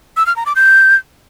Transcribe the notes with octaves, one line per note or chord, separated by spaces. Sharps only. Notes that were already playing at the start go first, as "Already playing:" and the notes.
E6
F6
A#5
D6
G6